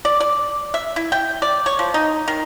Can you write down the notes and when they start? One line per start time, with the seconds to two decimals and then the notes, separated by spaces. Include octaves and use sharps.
0.05 D5
0.20 D5
0.74 E5
0.96 E4
1.12 G5
1.42 D5
1.66 C#5
1.79 F3
1.94 D#4
2.28 D#3